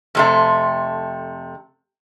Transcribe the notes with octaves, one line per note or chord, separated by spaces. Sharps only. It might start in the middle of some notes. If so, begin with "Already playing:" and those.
F2 C3 A3